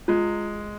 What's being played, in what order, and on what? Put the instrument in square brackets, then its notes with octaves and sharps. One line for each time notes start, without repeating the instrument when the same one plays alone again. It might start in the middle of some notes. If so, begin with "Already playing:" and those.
[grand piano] G#3 [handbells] F4